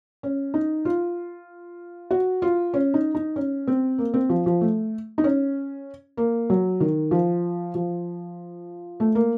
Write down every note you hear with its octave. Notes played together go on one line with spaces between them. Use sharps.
C#4
D#4
F4
F#4
F4
C#4
D#4
D#4
C#4
C4
A#3
C4
F3
F3
A3
D#4
C#4
A#3
F#3
D#3
F3
F3
A3
A#3